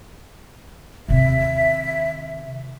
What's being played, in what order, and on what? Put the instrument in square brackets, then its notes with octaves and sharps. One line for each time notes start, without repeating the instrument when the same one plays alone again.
[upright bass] D#2 C3 [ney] E5